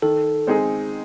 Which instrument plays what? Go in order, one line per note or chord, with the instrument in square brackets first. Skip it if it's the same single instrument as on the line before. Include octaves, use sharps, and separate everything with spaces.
[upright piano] D#3 [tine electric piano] A4
[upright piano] G#3 C4 D#4 G#4